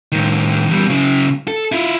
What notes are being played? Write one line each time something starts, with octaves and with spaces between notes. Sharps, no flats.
A2 D#3
E2 G3
C#3 F#3
A4
E4 F4